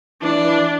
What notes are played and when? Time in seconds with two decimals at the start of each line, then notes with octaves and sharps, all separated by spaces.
0.22 E3 D4
0.44 E3